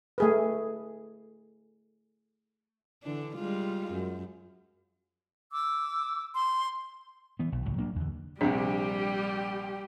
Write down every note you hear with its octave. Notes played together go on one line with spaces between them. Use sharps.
A3 G#4 B4
D3 E3 D4
G3 G#3 F4
F#2
D6 E6
C6
E3 B3
B1
C#2 A2 C3
F#3 A#3 D4
E2 D3
A#1 C3 G3 D4 G4